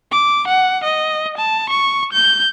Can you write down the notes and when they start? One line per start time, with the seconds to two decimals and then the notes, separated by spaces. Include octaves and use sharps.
0.11 D6
0.47 F#5
0.84 D#5
1.37 A5
1.70 C#6
2.13 G6